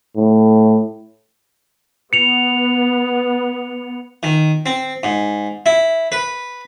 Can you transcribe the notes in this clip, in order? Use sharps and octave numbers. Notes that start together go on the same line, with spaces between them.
A2
B3 C#7 F7
D#3
C4
G#2
E4
B4